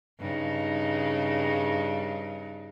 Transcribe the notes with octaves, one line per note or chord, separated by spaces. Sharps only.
G2 C#3 D#4